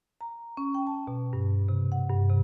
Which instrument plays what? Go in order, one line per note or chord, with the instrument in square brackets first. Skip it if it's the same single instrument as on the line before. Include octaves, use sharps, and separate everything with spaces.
[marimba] A#5
C#4
G5
A5
B2
G2
C3
F#5
G2
C3